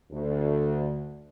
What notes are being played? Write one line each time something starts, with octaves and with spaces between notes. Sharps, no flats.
D2